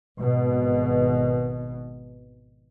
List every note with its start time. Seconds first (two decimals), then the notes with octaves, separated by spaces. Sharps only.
0.20 G#1 B2